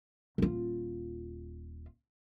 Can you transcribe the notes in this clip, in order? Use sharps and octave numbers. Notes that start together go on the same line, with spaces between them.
D#1 F4